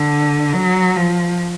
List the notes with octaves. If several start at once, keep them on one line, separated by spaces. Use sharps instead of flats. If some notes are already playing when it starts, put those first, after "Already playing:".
Already playing: D3
F#3
F3